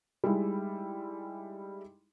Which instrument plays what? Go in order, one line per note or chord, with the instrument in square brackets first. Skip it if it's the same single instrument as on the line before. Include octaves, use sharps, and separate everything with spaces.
[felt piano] G3 G#3 D#4 E4